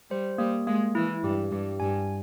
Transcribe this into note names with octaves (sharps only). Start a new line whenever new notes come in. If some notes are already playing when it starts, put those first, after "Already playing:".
G3 C5
G3 A#3
G#3 A#3
E3 E4
G2 G4
G2 G4
G2 G#5